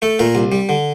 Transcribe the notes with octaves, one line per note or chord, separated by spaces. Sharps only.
A3 A4
A#2 A#4
C2
G3
D3